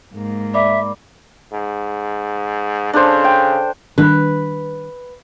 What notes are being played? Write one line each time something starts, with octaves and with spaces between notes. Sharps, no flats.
G#2 A#3
D5 E5 B5 D6
G#2
C#3 D4 A4 C5
G5
D#3 G3 D4 B4